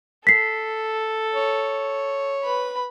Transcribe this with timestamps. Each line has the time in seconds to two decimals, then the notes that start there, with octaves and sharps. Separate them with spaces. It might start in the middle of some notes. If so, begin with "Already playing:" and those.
0.27 A4 B6 C7
1.34 C#5
2.44 B4 B5